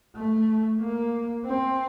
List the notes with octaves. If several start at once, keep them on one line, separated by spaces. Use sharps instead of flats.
A3
A#3
C4